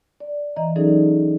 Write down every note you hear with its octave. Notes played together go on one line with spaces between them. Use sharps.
D5
E3 D#5 A#5
F#3 C#4 D#4 G#4 A4 D5